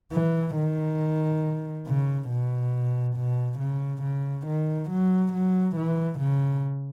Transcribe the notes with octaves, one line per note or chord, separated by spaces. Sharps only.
E3
D#3
C#3
B2
B2
C#3
C#3
D#3
F#3
F#3
E3
C#3